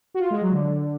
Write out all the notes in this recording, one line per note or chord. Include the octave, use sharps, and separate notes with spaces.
F#4
F4
G#3
F#3
D3